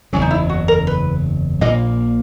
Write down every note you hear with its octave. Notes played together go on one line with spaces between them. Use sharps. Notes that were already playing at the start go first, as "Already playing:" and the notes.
F#1 E2 C#3 F#3 C#4
D#4
E4
F#4
A#4
B4
A#1 A#2 A#3 D#5